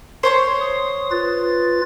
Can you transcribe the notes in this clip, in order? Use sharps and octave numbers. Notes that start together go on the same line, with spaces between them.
C5 C#5 C6
D#6
F4 B4 A6